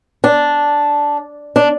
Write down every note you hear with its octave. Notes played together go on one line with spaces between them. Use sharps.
D4
D4